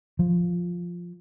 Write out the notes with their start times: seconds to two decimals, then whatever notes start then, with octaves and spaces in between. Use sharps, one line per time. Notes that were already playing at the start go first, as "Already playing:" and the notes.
0.19 F3